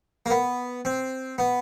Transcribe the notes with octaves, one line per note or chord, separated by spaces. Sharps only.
A#3
B3
C4
B3